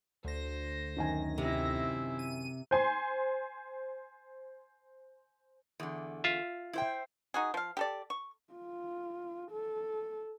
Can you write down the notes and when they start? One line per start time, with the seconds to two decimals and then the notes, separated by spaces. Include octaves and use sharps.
0.25 D2 C5 A#6
0.96 F#2 D#3 G#5
1.38 C3 C4 E4
2.19 D#7
2.71 C5 G#5 C6
5.80 E2 D3
6.24 F4 E5
6.73 E4 C5 G5
7.34 D#4 F#4 G#4
7.54 F3 F5
7.77 G4 A4 D5
8.10 C#6
8.54 F4
9.52 A4